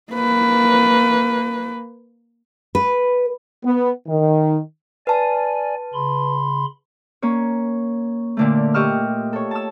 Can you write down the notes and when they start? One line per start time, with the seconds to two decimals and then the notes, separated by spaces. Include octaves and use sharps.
0.12 A#3 B4
2.75 B4
3.64 B3
4.08 D#3
5.07 B4 D5 G#5 A5
5.94 C#3 B5 C6
7.22 A#3 C#4 C#5
8.37 A#2 D3 A3
8.74 G4 D#5 C#6 E6 F6
9.33 A4 C#5
9.51 A5 E6